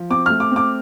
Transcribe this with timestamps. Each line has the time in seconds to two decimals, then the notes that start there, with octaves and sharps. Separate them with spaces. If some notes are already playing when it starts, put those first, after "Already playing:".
Already playing: F3
0.10 C4 D6
0.26 A3 F6
0.40 D6
0.51 C4 D6